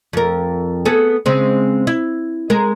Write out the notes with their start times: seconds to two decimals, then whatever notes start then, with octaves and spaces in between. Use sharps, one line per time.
0.13 F2 A#4
0.85 B3 G#4 A4
1.26 C#3 G#3 C4
1.87 E4
2.50 G#3 A#4